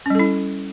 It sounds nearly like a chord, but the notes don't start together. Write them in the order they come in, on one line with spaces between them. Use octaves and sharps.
C#4 G3 A4 E4